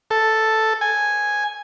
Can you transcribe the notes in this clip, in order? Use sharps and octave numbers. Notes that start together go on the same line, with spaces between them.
A4
G#5